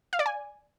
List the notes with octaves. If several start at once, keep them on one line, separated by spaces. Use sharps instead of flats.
F5
D5
G#5